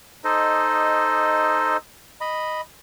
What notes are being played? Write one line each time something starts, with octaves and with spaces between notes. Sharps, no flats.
D#4 A4 C5 D#5
D#5 B5